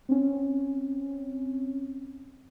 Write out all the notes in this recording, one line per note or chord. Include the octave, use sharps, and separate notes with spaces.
C4 C#4